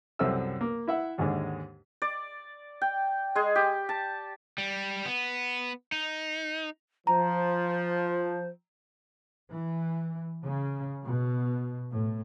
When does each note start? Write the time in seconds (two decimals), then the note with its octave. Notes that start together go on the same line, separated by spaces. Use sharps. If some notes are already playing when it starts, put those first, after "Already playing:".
0.19 C2 F#2 C4 A4 E5 E6
0.61 A#3
0.87 E4 E5 F#5
1.18 D#2 G#2 D3 G#3
2.02 D5
2.82 G5
3.35 G#3 G#4
3.55 G4
3.89 A5
4.58 G3
5.06 B3
5.92 D#4
7.07 F3 C5 A#5
9.50 E3
10.45 C#3
11.04 B2
11.92 A2